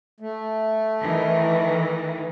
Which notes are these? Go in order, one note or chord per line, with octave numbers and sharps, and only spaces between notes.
A3
D#3 E3